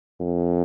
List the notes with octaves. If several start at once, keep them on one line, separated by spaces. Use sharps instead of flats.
F2